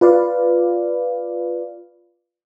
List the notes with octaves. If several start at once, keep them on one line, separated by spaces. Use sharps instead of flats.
F4 B4 D5 F5